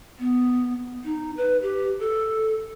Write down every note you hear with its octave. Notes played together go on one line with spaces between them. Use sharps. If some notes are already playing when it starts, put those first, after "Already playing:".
B3
D#4
B4
G4
A4